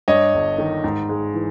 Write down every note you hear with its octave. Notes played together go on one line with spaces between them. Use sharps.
G2 C#5 D#5
G1
D#3
G#2
G#3
E3